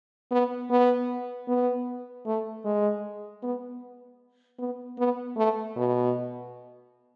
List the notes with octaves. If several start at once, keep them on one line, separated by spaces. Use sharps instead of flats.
B3
B3
B3
A3
G#3
B3
B3
B3
A3
B2